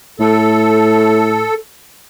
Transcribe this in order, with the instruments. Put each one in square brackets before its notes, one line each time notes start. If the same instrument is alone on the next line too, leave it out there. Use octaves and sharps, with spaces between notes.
[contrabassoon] A2 [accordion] A4